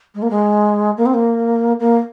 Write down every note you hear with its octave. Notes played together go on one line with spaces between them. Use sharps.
G#3
A#3
G#3
A#3
C4
A#3
A#3